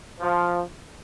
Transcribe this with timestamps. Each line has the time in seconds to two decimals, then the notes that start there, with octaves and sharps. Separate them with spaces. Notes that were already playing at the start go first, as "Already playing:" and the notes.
0.20 F3